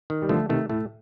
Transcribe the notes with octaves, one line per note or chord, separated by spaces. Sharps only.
D#3
G3
D3 F3 A3
C3 D#3 A3
A2 A3